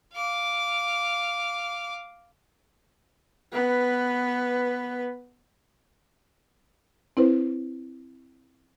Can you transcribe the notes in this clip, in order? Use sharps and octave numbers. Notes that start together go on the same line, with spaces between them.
F5 D6
B3 B4
C4 E4 B4 C5